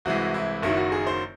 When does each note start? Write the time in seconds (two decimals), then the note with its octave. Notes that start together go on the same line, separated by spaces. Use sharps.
0.05 C2 C3 E3 G#3 F#4
0.34 E4
0.62 F#1 F#2 D#3 F#3 E4
0.77 F#4
0.92 G#4
1.07 C5